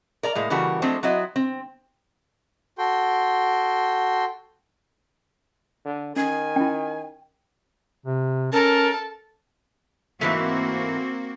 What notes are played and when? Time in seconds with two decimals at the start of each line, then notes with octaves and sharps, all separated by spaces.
0.23 A#4 D5 A#5
0.35 A2 G#3 A#3
0.50 C#3 E3 G3 A#3 F#4 A4
0.82 F3 G#3 A3 C4 D4
1.03 F#3 C4 E4 F#4 D#5
1.36 C4
2.78 F#4 A4 G5 C6
5.85 D3
6.16 D#3 C#4 G#5
6.56 C#4 E4 G5
8.06 C3
8.53 C#4 A4 A#4 A5
10.21 G#2 E3 A3 A#3 C4 F#4